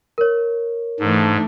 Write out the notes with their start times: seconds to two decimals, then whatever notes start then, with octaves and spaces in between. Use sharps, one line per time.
0.18 A#4 C#5
1.00 G#2 E3 A3 D4